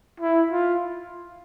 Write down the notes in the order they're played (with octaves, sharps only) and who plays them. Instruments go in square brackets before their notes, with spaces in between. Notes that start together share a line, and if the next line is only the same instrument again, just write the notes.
[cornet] E4
F4